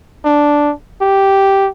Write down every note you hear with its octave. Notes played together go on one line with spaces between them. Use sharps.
D4
G4